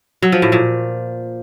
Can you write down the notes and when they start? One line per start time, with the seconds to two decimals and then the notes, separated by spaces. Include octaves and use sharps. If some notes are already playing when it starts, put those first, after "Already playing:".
0.22 F#3
0.32 F3
0.42 A2
0.52 A#2